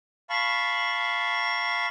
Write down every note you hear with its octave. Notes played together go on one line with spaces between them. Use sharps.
F5 A5 B5 C#6